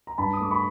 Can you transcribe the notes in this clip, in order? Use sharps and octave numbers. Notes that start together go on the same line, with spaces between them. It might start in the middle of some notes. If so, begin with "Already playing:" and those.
A#5
G2 A5 B5
D#6
A3 D6
B5 C#6